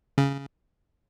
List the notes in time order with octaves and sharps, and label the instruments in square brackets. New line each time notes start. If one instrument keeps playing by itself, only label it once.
[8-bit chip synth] C#3